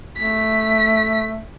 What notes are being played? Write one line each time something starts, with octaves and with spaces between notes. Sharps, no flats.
A3 B6